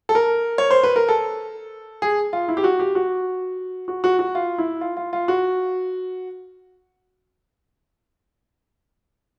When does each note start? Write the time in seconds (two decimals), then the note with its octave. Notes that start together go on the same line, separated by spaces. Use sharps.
0.09 A4
0.15 A#4
0.58 C#5
0.71 C5
0.83 B4
0.96 A#4
1.09 A4
2.02 G#4
2.33 F4
2.48 E4
2.57 G4
2.64 F#4
2.79 G4
2.95 F#4
3.88 F#4
4.04 F#4
4.19 F#4
4.35 F4
4.58 E4
4.81 F4
4.97 F4
5.13 F4
5.28 F#4